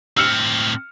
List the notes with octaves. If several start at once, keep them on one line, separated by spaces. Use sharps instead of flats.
A2 C4 E6 F6 C#7